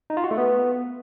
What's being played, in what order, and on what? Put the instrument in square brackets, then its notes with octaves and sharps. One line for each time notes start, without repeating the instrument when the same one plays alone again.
[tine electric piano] D#4
F4
F#4
A3
B3